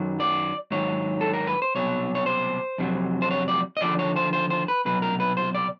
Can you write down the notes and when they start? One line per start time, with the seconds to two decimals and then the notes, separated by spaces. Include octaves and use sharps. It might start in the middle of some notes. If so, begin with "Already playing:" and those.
Already playing: F#2 D#3 F#3
0.20 D5
0.71 G#2 D#3 F#3 C#5
1.21 A4
1.33 A#4
1.47 B4
1.62 C5
1.75 C2 B2 F#3 C#5
2.15 C#5
2.26 C5
2.78 F2 C3 D#3 F#3
3.22 C5
3.31 C#5
3.48 D5
3.77 D#5
3.81 D#2 D3 F3 D5
3.99 C#5
4.16 C5
4.33 C5
4.50 C5
4.68 B4
4.85 C2 B2 F#3 B4
5.02 A#4
5.20 B4
5.37 C5
5.55 D5